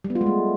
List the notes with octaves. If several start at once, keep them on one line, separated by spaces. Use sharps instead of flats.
G3
B3
F4
G#3
A3